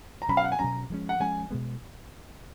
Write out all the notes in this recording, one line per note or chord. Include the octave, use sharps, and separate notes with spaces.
A#5
B2 F#3 C#4 B5
F5
F#5
G#5
B2 F#3 C#4 A#5
F3 G#3 C#4
F#5
F3 G#3 C#4 G#5
B2 G#3 B3